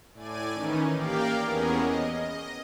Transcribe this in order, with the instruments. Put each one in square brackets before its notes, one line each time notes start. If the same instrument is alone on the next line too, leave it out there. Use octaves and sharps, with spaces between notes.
[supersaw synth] A2 D5 G#5 D#7
D#3 E3 C#4 D#4
A#3 G4 A#4 D5 F5 G5
E2 B3 C#4 G#4 A#4
D#5
D#5